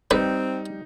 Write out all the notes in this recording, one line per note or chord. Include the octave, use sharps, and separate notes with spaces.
G3 C4 D#4 B4